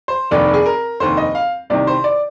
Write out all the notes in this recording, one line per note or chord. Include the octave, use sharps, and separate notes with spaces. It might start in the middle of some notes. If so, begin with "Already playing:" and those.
C5
F1 D#2 D3 D5
G#4
A#4
F1 D#2 D3 C5
D#5
F5
C2 C3 D#3 D5
C5
D5